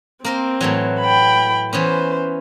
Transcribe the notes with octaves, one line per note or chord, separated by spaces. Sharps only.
A#3 C4 A#4 C5
A2 E3 F#3
G5 B5
E3 B3 C#4 C5